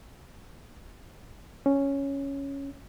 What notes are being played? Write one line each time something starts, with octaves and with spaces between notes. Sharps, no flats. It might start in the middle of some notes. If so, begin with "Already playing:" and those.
C#4